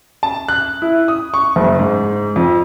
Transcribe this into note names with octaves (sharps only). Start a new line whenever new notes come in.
A5
F#6
E4
D#6
C#6
F#1
G#2
F2